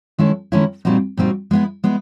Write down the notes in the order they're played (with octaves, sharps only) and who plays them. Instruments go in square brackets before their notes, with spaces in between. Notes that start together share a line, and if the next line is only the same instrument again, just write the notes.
[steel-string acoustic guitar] D#3 G#3 C#4 E4 A4
D#3 G#3 C#4 E4 A4
A#2 G3 C4 D#4 F#4
A#2 G3 C4 D#4 F#4
G#3 B3 E4
G#3 B3 E4